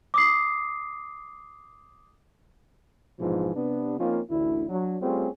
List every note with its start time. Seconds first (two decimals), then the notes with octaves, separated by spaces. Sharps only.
0.14 D6 D#6 C7
3.19 A#1 G#2 B2 E3 F3
3.54 C3 B3 D4
3.98 F3 A#3 C4 C#4 D#4 F4
4.30 A1 D2 D3 E4
4.69 F#3 D4
5.01 G3 A3 C4 C#4 F4 G#4